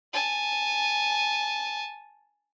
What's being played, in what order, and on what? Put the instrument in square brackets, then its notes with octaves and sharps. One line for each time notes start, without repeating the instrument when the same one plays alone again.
[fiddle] G#5 A5